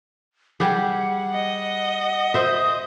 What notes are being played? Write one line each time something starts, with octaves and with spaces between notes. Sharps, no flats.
G3 G4 G#4 F#5
D#5
C5 E5 D#6